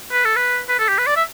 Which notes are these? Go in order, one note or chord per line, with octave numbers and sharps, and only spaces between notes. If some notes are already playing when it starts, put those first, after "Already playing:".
B4
A4
B4
B4
A4
G4
B4
D5
E5